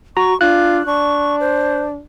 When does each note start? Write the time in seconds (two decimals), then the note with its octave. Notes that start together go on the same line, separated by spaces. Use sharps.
0.17 F#4 A#5 C#6
0.41 D4 F4 F#6
0.86 D4 C#6
1.40 C5